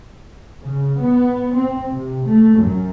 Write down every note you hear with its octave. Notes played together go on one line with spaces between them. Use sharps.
C#3
B3
C4
C3
A3
F#2